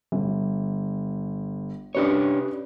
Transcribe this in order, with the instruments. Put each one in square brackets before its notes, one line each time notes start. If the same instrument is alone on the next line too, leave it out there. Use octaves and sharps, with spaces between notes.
[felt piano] G1
[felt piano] C#4 B4 D5 [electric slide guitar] D4 G4 C#5